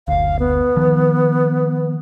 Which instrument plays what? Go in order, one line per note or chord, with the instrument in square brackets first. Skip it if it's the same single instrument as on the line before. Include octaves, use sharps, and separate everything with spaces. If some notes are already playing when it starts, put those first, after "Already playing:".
[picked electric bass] F#1 D2 [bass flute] F5
[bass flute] B3
[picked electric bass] D#3 F3